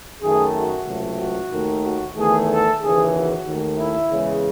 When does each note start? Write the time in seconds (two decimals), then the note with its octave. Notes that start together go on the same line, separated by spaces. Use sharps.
0.22 F#2 D#3 A3 G#4
0.55 F#4
0.87 C#2 C3 F#3 A3
1.19 F#4
1.52 D#2 D#3 A3
1.84 F#4
2.16 E2 D#3 A3 G#4
2.48 A4
2.81 D#2 C#3 E3 G#4
3.13 F#4
3.45 D#2 D#3 A3
3.78 E4
4.10 E2 C#3 G#3